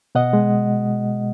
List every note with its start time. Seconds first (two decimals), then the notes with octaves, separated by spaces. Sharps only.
0.15 B2 D#5 F#5
0.33 G#3